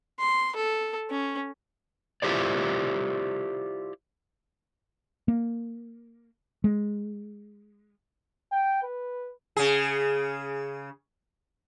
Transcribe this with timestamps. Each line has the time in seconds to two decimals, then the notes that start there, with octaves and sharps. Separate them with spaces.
0.20 C6
0.56 A4
1.10 C#4
2.22 E4 F4 G4 C5 D5
5.28 A#3
6.64 G#3
8.52 G5
8.83 B4
9.57 C#3 G#4